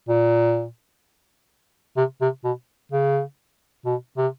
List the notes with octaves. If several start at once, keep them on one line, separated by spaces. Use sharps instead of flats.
A#2
C3
C3
B2
C#3
B2
C3